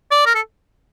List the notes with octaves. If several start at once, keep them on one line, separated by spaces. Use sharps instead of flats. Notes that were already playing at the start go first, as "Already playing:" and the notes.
D5
A#4
A4